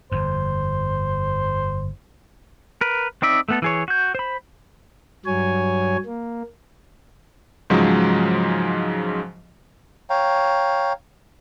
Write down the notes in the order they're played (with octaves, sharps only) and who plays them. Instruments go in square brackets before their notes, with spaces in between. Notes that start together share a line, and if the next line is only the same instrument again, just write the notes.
[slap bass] G1 F2 [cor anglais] C5
[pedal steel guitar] A#4 B4
C4 D#4 D5 E5
A3 B3 A4
E3 G#4 C#5
F#4 G6
C5 B5
[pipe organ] G2 F#3 C#5 G#5
A#3
[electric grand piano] G#2 C#3 F3 F#3 G#3
[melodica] C#5 F5 G5 A#5